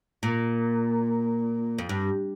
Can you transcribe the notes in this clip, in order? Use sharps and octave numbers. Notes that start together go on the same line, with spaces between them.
A#2
F2
G2